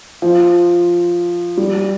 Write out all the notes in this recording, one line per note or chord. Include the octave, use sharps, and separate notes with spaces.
F3
G3